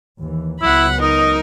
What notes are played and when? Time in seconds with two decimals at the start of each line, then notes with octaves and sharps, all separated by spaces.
0.20 D#2 E3
0.61 C#2 F#3 B3 E4 F#5 B5
1.01 D#4 A#4 D#5